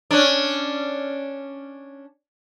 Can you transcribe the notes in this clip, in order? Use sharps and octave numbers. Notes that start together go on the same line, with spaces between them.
C#4 D4